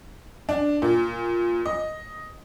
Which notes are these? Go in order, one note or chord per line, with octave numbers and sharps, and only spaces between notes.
D4
A#2
D#5